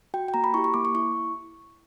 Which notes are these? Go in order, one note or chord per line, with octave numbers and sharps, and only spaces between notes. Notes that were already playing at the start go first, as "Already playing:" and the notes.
F#4 G5
G5
A#3 A#5
B5
E4 G4 C#6
C#6
A#3 D6
C#6
E4 C#6